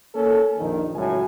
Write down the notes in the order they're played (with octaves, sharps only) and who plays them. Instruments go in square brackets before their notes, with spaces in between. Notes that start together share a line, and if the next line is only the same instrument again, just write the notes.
[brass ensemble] A#3 C#4 A4
A#1 F2 D#3
C#2 A2 F#3 G#5